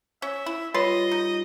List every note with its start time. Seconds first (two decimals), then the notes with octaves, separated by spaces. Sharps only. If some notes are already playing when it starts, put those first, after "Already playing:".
0.22 C#4 E5
0.46 E4
0.74 G3 F4 B4 C#5 D#5 B5 C6
1.11 D#4